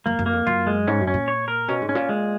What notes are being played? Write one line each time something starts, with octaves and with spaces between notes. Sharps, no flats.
F#2 A#3
F#2
A#3
F2
F#2 F4
G#3
G#2 C#4
F#2
C#4
A#2
C#5
A#4
B2 C#4
G#2
C#4
A#2
G#3